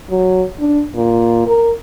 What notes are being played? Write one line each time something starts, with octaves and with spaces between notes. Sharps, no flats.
F#3
D4
A#2
A#4